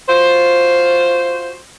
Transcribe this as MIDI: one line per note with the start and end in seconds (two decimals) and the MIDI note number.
0.09 1.56 65
0.09 1.56 66
0.09 1.56 72